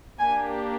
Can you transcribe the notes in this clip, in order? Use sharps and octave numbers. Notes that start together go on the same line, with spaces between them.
A#3 D4 G4 G#5